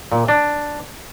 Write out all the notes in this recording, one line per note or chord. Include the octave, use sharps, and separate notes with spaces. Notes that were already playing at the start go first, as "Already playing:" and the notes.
A#2
D4